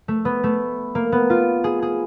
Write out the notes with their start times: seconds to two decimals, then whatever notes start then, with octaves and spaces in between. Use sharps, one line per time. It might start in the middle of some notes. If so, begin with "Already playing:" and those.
0.08 A3
0.25 B3
0.44 A3
0.95 A#3
1.12 B3
1.30 F4
1.64 G#4
1.82 G#4